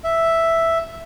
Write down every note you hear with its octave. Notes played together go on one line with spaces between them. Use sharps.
E5